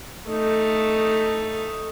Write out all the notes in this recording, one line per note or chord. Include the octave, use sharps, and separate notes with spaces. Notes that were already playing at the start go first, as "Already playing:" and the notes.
A3 D#4